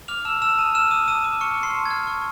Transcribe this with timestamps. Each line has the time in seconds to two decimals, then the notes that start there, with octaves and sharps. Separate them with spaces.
0.08 D6 F6 F7
0.25 A5 E6 E7
0.42 A5 E6 E7
0.58 A5 D#6 D#7
0.75 E6 F6 E7
0.91 D6 D#6 D#7
1.08 A5 D#6 D#7
1.24 D6
1.40 C#6 F6 C#7
1.57 F6
1.63 C6 C7
1.75 A5
1.85 G#6
1.91 F6
2.07 C#6